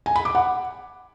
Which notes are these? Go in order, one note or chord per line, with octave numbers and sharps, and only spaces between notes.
G#5
B5
D6
F#5